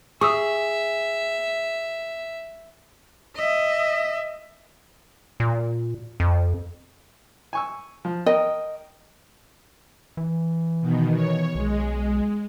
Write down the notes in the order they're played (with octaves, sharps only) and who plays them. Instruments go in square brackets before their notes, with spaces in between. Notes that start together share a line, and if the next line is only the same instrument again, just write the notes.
[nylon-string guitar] G#4 [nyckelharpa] E5 [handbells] C#6 D#6 E6
[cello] D#5 E5
[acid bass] A#2
F2
[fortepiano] G#5 C#6 E6
F3
[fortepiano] A#4 G5 [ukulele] D#5
[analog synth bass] E3
[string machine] B2 D#3
C#5
[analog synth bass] B1 [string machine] G#3